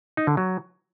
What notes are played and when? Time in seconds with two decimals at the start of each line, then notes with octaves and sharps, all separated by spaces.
0.17 D#4
0.27 D3
0.37 F#3